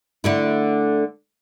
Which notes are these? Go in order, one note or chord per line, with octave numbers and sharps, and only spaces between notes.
D3 A3 E4